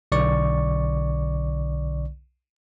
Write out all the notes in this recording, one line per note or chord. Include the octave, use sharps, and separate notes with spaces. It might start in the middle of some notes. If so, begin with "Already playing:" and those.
B1 D3 D5 C#6